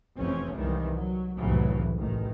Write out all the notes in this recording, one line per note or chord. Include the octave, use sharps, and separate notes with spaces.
F1 E2 C4 C#4
C2 D#3 E3 G3 G#3
F#3
F1 C2 A2 C#3 E3 F#3
A1 D#3